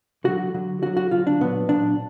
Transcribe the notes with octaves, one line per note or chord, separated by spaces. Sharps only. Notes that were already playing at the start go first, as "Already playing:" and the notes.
D3 F#3 F#4
D3 F#3
D3 F#3 F#4
F#4
D3 F#3 F4
D4
A#2 F#3 B3
A#2 F#3 D4